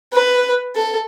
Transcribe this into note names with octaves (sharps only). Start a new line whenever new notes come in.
B4
A4